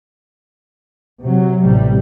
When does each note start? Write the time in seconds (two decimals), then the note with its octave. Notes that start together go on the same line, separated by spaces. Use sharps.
1.24 C3 F#3
1.64 A1 C3 G3